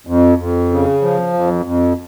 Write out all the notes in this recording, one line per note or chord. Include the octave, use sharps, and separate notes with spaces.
F2
F2
C#3
F3
F2
F2